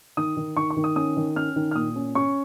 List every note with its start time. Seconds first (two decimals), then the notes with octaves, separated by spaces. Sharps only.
0.17 D#3 D#6
0.37 D#3
0.57 D#3 C#6
0.70 C#6
0.76 D#3
0.84 D#6
0.96 C#4 D#6
1.17 D#3
1.36 C#4 F6
1.56 D#3
1.71 F6
1.75 A#2 D#6
1.96 C#4
2.15 C#4 C#6